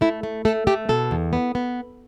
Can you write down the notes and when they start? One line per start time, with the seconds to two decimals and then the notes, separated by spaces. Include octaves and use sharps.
0.01 A3 E4
0.23 A3
0.45 A3 A4
0.67 A3 G4
0.89 B2 A4
1.11 E2
1.33 B3
1.55 B3